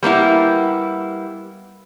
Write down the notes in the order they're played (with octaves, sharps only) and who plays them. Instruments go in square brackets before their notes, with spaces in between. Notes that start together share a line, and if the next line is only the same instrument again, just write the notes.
[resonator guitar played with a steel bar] G3 A#3 B3 E4